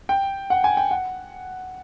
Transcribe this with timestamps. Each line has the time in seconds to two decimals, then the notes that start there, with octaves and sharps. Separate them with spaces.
0.09 G5
0.50 F#5
0.64 G#5
0.77 G5
0.91 F#5